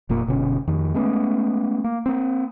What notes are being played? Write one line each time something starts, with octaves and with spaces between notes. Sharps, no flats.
F1 A#2 A#3
F#1 B2 D3 C#4
F2 D#3
G#3 A3 B3 C#4
A#3
A#3 C4